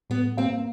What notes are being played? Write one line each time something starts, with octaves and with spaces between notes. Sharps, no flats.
A2 B3
A#3 C4